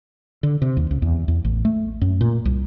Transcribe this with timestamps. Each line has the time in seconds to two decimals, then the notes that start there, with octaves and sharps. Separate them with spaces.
0.43 D3
0.62 C3
0.77 D#2
0.91 C#2
1.02 E2
1.28 E2
1.45 A1
1.65 A3
2.01 F#2
2.21 A#2
2.45 C2